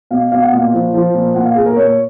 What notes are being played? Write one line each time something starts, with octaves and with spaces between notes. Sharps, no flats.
B2 F5
B2 F5
F#5
A#2 F5
F3
F3
A#2
A#2 F#5
F5
A#2 G#4
A#4
A#2 C#5